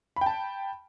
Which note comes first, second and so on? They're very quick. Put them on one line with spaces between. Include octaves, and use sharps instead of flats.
B5 G5 A5